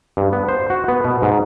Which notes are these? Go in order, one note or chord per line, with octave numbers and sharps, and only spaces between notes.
G2
B3
C5
F#4
B3
B2
G#2